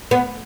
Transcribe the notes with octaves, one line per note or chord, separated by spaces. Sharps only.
B3